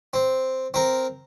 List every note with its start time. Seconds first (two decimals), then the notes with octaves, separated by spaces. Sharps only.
0.14 C4
0.74 C4 A#4